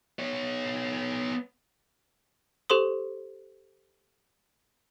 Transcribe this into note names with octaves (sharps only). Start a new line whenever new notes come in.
B3 C#5
G4 A4 C5 C6 D#6